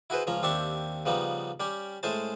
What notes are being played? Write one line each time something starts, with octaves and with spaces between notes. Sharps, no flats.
E4 F#4 G#4 B4 C5
C#2 F3 C#4 A#5
D#2 C4 D4 G4 E5 C#6
C#3 F3 G3 B3 D#4
G3 C#4 G4
A2 G#3 C#4 G#4 C5 A5